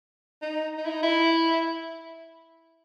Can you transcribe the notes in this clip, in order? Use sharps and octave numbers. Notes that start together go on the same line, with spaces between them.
D#4
D#4
E4
D#4
E4